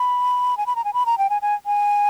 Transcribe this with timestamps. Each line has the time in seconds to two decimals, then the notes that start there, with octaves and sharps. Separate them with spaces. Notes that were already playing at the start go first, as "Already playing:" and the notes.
Already playing: B5
0.57 G#5
0.66 B5
0.76 A#5
0.85 G#5
0.94 B5
1.06 A#5
1.18 G5
1.30 G#5
1.42 G#5
1.66 G#5